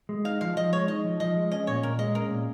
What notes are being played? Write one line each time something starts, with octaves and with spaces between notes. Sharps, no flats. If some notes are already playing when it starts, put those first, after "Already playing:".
G#3
D#4 F5
F3 F5
F3 D#5
G#3 C#5
D#4 D#5
F3
F3 D#5
G#3
C#4 D#5
A#2 C#5
A#2 A#4
G#3 D#5
C#4 A#4
A#2